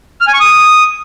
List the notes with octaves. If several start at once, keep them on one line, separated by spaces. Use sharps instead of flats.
F6
G#5
C#6
D#6